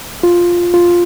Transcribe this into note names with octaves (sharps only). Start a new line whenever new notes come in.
F4
F4